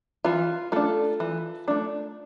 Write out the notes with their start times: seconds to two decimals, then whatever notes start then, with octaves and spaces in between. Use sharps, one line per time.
0.25 E3 F4
0.72 A3 D4 F4 A4
1.20 E3
1.68 A3 D4